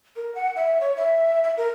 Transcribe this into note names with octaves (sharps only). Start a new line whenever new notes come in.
A#4
F#5
E5
C#5
E5
E5
A#4